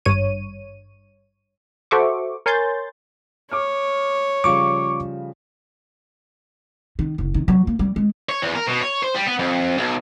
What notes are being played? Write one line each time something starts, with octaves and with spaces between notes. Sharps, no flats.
G#1 G2 C#5 D#7
F#4 A4 C5 E5 C#6 D6
A#4 C#5 G#5 C6 G6 A6
C#5 D6 F6
C#3 F3 G3 C#6 D6
D#3
F#1
D#3
F#3
A#3
G3
G#3
C#5
E2
A#4
B2
C#5
C5
G3
B3
F2
B1